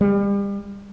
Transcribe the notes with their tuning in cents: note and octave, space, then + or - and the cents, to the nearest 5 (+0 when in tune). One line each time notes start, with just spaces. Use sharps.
G3 +35